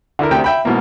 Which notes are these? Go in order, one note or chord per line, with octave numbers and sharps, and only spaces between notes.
D3 E4 A#4
D2 C3 G5
E5 G5 B5
G#2 B2 E3 A#3